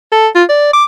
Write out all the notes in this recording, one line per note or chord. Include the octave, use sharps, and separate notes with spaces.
A4
F4
D5
D6